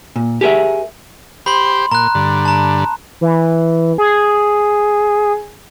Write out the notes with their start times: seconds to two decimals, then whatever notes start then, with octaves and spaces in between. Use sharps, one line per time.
0.16 A#2
0.41 G4 G#4 A#4 E5
1.46 G4 C5 B5 C6
1.91 A#2 A#5 F#6
2.15 G2 D3
2.45 A5 A#5
3.21 E3
3.98 G#4